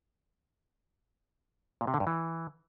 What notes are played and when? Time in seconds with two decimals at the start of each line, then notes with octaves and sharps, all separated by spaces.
1.81 A#2
1.87 C3
1.94 D3
2.00 G2
2.07 E3